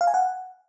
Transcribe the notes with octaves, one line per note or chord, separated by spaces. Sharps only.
F5
G#5
F#5